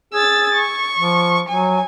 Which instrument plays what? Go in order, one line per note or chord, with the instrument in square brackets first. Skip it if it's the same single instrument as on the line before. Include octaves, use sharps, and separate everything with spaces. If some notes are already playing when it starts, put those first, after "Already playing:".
[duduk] G#4 [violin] E6 A6
[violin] C#6
[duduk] F3
[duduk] F#3 [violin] G#5